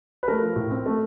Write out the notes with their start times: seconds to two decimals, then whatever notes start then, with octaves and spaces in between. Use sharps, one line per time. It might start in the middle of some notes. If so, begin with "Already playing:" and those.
0.23 B4
0.28 A3 A#4
0.42 F3
0.56 A2
0.71 C4
0.86 A3